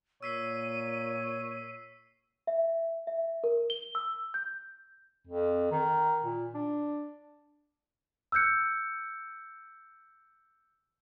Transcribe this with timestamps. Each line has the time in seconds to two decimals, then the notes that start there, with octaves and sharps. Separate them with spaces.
0.23 A#2 C#5 E6 B6 C7 D#7
2.47 E5
3.07 E5
3.44 A#4
3.70 G7
3.95 E6
4.34 G6
5.27 F2
5.72 D#3
6.24 A#2
6.55 D4
8.32 E6 F#6 G6 C#7